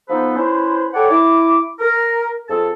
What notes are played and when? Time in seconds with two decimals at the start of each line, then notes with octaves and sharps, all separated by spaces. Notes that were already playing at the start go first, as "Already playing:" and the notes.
0.08 F3 B3 D#4 A4 B4 C5
0.36 C#4 E4 B4 C5
0.93 A4 B4 C#5 D5 F#5 G5
1.10 E4 D6
1.80 A#4
2.49 F2 F4 G#4 A4 A5